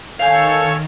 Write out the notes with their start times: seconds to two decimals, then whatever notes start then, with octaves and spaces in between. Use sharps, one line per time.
0.19 D#3 A4 C#5 F5 G5 G#5